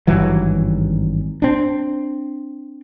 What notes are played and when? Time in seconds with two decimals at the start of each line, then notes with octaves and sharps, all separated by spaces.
0.07 G#1 G2 E3 F#3
1.42 C4 D4